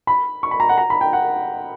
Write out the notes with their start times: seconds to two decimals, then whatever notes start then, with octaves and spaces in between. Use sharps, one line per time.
0.07 B5
0.43 C#6
0.51 B5
0.60 A#5
0.69 F#5
0.78 A#5
0.90 B5
1.01 G5
1.13 F#5